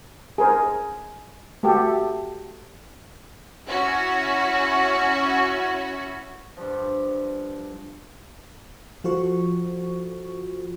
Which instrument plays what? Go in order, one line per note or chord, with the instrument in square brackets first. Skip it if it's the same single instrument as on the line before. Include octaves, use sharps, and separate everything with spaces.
[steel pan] G#4 A#4 C5
A3 F#4 G4 A4
[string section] C#4 E4 F#4
[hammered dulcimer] G2 F3
[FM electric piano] F3 F4 F#4 A4 C5 C#6